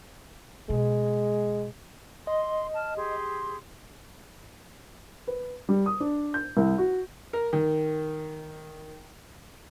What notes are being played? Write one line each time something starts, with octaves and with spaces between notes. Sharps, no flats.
B2 G#3
D#5 C6
A5 F6
G4 G#4 C6
B4
G3
D#6
D4
G6
C2
F#4
A#4
D#3